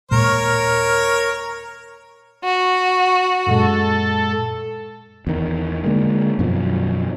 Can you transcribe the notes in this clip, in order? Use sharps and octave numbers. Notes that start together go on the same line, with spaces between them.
D#2 A#2 G#3 A#4 C#5
F#4
F#2 A#2 G#3 A4
E2 D#3
D3 G#3 A#3
F#2 B2 D#3 F3